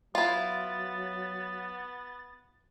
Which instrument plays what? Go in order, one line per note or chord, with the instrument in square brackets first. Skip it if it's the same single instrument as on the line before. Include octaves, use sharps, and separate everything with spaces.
[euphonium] F#3 [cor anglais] B3 [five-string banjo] E4 F4 [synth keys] A6